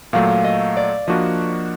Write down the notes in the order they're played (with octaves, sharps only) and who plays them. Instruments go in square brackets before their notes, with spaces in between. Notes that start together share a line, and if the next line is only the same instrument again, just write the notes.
[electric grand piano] A#2 F#3 A3 [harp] F5
[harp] D#5
D5
[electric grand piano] F3 A#3 D4 F#4 [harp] D#5